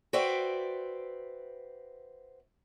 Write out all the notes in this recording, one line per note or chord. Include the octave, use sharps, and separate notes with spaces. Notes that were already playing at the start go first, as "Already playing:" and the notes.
F#4 B4 C5 D5 E5 G5